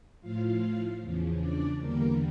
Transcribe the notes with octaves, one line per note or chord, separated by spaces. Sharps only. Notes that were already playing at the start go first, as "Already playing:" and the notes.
A2 F3 F4 F5
E2 C#3 F3
D4 D5
E2 D3 G3 A#3 A#4